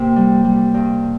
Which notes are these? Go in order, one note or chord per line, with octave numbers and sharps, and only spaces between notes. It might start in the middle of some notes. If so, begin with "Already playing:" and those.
Already playing: C3 A#3 A#4
G3
G3
G2